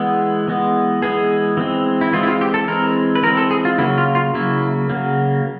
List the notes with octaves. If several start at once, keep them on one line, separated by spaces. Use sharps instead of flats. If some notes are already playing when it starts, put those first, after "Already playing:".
Already playing: E3 G#3 B3
E3 G#3 B3
E3 G#3 B3 G#4
E3 G#3 C4
E4
E3 G#3 C4 F4
E4
F4
G4
A4
E3 G#3 C4 A#4
B4
E3 G#3 C4 A#4
A4
G#4
F4
C#3 F#3 A#3 E4
F4
F4
C#3 F#3 A#3 E4
C#3 F#3 A#3